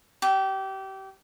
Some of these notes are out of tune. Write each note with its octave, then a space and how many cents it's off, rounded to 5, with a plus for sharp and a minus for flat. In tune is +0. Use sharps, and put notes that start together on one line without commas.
G4 -25 E5 +0